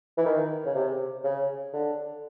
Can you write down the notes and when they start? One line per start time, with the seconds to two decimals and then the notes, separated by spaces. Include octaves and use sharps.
0.18 E3
0.26 D#3
0.66 C#3
0.75 C3
1.24 C#3
1.73 D3